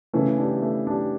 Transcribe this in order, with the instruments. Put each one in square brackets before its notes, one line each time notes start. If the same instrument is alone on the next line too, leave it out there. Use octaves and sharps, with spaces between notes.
[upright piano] C#3 E3 [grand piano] A3
[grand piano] D4 G4
A3
D4 G4